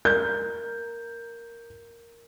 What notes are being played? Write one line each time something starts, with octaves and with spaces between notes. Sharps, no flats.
A#4 G6